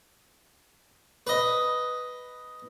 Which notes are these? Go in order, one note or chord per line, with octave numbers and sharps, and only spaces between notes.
B4 D#5